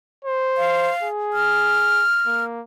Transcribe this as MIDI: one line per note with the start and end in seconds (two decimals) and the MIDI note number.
0.25 0.92 72
0.58 1.08 77
1.03 2.04 68
1.33 2.44 89
2.26 2.61 58